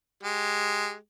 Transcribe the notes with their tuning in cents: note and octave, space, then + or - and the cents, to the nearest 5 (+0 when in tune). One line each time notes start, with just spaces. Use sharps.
G#3 +0 G4 +0